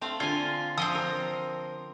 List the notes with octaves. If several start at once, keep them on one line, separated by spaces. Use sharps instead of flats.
A3 C4 F5
D3 F4 G#5
F3 C4 C6 D#6
A#4